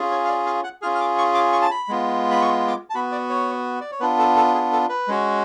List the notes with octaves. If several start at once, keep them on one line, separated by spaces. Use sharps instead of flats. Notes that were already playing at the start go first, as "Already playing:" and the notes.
Already playing: C#4 F4 G#4
C#5
F5
D5
F5
F#5
C#4 F4 G#4 F6
F6
D6
C#6
D6
C#6
A5
B5
G#3 B3 F4
B5
C#6
D6
A5
B3 F#4 B5
D5
C#5
D5
C#5
B3 D4 F4 B4
A4
A4
G#4
A4
B4
G#3 C#4 F#4